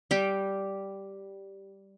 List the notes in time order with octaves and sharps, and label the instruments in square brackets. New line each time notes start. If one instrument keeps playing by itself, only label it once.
[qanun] G3 G4